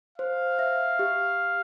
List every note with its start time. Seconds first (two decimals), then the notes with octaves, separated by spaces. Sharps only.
0.18 C5 F5
0.59 E5
0.99 G4